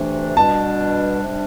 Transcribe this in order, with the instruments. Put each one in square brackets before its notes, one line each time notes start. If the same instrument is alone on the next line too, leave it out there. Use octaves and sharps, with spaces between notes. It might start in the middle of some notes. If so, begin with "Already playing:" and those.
Already playing: [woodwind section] D2 C3 E3 A3 D4
[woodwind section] B2 G3 D4 [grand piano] A5
[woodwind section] C3 G3 D4